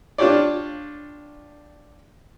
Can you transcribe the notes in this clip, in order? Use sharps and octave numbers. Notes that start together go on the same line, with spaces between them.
D4 F4 G4 C#5 D5